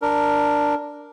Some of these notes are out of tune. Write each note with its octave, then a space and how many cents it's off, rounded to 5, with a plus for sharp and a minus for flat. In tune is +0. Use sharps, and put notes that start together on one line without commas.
D4 +0 A#4 +0